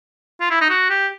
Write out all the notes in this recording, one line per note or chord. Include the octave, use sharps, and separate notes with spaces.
F4
E4
D#4
F#4
G4